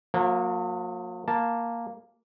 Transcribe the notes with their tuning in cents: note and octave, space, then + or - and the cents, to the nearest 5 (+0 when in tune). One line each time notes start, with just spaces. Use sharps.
F#3 -45 A#3 -10
A#3 +0 A5 +0